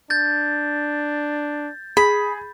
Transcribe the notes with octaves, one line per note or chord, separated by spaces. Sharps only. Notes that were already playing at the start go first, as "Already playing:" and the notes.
D4 G6 A6
G#4 B5